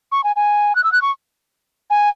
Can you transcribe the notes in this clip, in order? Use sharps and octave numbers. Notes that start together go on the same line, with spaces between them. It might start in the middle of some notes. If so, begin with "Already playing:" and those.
C#6
G#5
G#5
F#6
E6
F#6
C#6
G#5